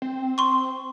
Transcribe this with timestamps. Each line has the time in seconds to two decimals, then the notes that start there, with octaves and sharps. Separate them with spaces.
0.02 C4
0.38 C6 C#6